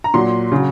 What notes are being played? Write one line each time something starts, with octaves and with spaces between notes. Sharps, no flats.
A#5
A#2 F#3 C6
C#3 F#3